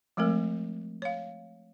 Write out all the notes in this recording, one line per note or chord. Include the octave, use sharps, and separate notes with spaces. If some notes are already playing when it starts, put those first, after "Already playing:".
F3 G#3 A3 C4 A#4
C#5 F5